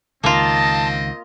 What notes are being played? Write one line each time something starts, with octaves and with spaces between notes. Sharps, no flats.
C#2 D#3 A#3 C4 F4 D#5 A5